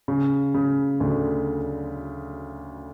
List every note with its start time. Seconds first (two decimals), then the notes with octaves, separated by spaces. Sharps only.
0.08 C#3
0.54 C#3
1.00 D2 D3